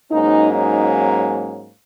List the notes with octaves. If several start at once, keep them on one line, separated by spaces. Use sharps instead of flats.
G#2 F#3 A#3 C#4 D#4
D#4